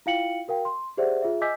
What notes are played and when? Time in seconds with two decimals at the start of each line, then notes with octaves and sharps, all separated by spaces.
0.06 E4 F4 F5 G5 C#7 F#7
0.48 F#4 A#4 F5 G5
0.65 C6
0.97 G4 G#4 C5 D5 E5 F#5
1.22 F4 G#4 E5
1.41 D#5 G#5 D6 E6 G6 B6